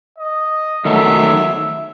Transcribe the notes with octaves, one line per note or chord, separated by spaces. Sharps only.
D#5
D#3 F#3 A3 E5
E5